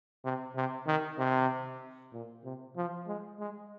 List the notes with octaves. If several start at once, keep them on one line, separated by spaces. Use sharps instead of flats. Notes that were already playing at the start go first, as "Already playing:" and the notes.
C3
C3
D#3
C3
A#2
C3
F3
G#3
G#3